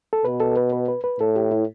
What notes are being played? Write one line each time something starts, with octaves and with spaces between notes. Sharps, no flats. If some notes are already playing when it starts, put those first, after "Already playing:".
A4
B2 B4
A4
B4
B4
B4
B4
A2 A4
G4
E4